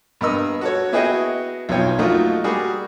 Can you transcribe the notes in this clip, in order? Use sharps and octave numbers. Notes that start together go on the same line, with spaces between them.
G2 B3 A#4 D#5 E6
F#4 A4 C#5
B3 E4 F#4 G#4 D#5 G5
B1 B2 F3 C#5 G5
F3 A3 A#3 D#4 F4 F#4
G3 F#4 G#4 A#4